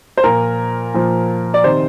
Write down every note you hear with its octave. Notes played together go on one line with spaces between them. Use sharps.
C5
A#2 F3 A#4
A#2 F3
D5
C3 D#3 C5